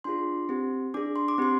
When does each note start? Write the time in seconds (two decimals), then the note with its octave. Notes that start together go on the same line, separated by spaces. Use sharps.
0.04 D4 F4 G#4 C6
0.49 C4 G4
0.94 D4 G#4 D6
1.16 C6
1.28 D6
1.38 C4 G4 C6